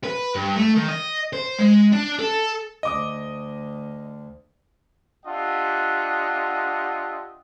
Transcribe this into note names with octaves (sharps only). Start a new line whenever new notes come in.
B4
G2
A3
D#3
D#5
C5
G#3
D4
A4
D2 D#5 D6 D#6
D4 F4 G4 D#5 E5 F#5